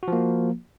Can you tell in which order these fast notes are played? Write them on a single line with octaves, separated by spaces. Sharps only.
F#4 F3 A#3